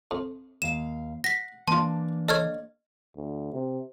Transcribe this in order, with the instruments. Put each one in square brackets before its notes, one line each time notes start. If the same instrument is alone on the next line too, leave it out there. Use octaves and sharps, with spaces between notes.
[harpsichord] F2
[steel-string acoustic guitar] D#2 F5 [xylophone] E7
[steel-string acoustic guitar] F#5 [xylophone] A#6 B6
[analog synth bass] E3 [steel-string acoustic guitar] A#3 D4 [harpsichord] F4 C6 [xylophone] A5
[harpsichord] A4 C#5 [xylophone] D#5 F6 G#6
[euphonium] D2
C3